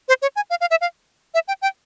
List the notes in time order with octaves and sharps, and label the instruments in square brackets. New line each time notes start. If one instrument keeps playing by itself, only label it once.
[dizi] C5
C#5
G#5
F5
F5
E5
F5
E5
G5
G5